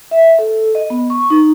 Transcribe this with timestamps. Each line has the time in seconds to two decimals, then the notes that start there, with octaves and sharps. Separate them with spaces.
0.11 E5
0.39 A4
0.75 D#5
0.90 B3
1.10 C#6
1.30 D#4